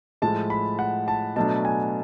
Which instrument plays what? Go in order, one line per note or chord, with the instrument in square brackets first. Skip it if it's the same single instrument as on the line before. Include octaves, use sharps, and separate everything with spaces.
[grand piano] A2 F3 G#3 A5
B5
F#5
A5
B2 F#3 A3 D4 A5
G#5